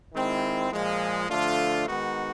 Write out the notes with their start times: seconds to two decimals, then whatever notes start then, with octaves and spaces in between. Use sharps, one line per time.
0.14 D#3 G#3 C4 E4
0.72 A#2 F3 G#3
1.29 D3 F3 A3 D4 F4
1.87 D#3 G#3 B3 D#4 F#4